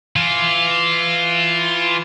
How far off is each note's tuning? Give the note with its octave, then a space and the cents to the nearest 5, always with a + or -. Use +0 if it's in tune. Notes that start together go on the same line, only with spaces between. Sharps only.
E3 +20 F4 +0